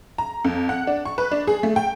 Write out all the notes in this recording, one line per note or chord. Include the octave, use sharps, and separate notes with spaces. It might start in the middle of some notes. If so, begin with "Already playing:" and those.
A#5
F2
F#5
D4
C#6
B4
D4
G#4
A3
G5